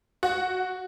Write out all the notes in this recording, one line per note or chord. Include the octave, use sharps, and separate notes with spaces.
F#4